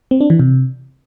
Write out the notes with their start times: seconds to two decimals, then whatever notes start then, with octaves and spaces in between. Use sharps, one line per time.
0.11 C4
0.21 D4
0.30 E3
0.39 C3